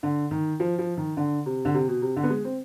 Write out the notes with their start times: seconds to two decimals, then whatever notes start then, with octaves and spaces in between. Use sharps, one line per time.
0.03 D3
0.31 D#3
0.60 F3
0.79 F3
0.97 D#3
1.17 D3
1.46 C3
1.65 D3
1.74 C3
1.88 B2
2.02 C3
2.16 D3
2.23 B3
2.30 G#3
2.44 C4